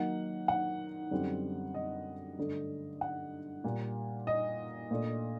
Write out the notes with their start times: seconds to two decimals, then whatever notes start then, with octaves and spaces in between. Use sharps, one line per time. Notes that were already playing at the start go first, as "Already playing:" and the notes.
Already playing: D#3 F#3 A#3 D#4 F#5
0.48 F#5
1.11 F#2 D3 G3 C4 D#4
1.74 D#5
2.38 G2 D3 A3
3.01 F#5
3.64 A#2 G3 A#3
4.27 D#5
4.91 A#2 A3 D4